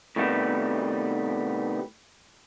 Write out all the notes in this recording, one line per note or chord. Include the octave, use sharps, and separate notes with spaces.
A2 C3 D#3 G3 A3 B3